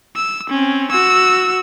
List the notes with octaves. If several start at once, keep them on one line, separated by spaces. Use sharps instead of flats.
E6
C4 C#4
F#4 E6